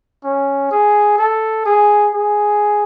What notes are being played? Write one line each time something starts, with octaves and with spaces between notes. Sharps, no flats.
C#4
G#4
A4
G#4
G#4